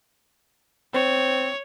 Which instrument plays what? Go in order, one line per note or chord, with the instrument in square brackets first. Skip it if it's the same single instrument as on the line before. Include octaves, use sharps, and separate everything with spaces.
[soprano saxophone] C4 [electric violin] C#5